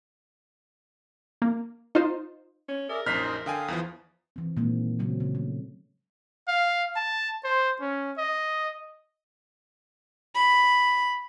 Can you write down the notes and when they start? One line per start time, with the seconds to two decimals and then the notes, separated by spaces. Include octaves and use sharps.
1.42 A#3
1.95 D#4 F4 C5
2.69 C#4
2.89 G#4 A#4 D5 E5
3.06 A#1 F#2 D#4 C5 D#5 F6 B6 C7
3.46 D3 F5 G5 G#5 D#6
3.68 E2 E3 F3
4.36 E3 C4
4.57 A#2 D#3 F#3 G#3 A#3 C4
4.99 C#3 F#3 C4
5.20 C#3
5.35 A3
6.48 F5
6.96 A5
7.44 C5
7.81 C#4
8.18 D#5
10.35 B5